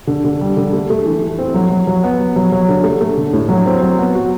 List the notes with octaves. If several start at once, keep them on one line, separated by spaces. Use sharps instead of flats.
D3
D3
G3
D3
A3
A3
E3
E3
C4
F#3
F#3
F#3
B3
F#3
F#3
F#3
D3
A3
A3
D3
A2
F#3
C4
F#3
B3
F#4